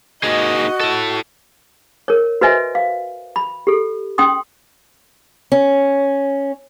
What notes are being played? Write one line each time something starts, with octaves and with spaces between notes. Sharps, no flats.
A#3 D#4 F#4 G#4 D#5
E4 A4
A#4 C#5
F#4 B4 C5 D#5 E5 G#5
F5
B5
G4 A4
C#4 G5 C6 D#6
C#4